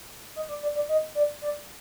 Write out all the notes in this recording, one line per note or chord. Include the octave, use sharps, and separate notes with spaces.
D#5
D5
D5
D5
D#5
D5
D5